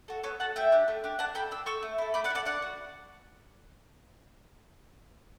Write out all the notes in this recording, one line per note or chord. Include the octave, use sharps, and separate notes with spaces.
F#4 A4
B3 A4 C#5
F#4 A4 F#5 A5
A3 E5 G5
D4 G4
A3
D4 G4
D4 F#5 A5
A4 G5 B5
D4 E6
A4 C#6 E6
A3
E4 A4
A3 B5 D6
D5 F#5
E4
A4 D5 F#5
D4 D5 F#5
F#4